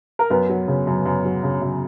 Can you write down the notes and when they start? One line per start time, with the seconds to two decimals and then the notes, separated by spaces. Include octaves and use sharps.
0.19 A#4
0.30 F#2 B3 B4
0.49 F#3
0.68 C#3
0.87 F#2
1.06 F#2
1.25 F#3
1.43 C#3
1.62 F#2